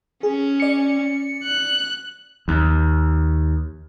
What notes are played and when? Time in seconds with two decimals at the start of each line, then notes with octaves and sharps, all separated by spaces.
0.23 C#4 G#4
0.60 D5 C#7
1.44 F#6
2.48 D#2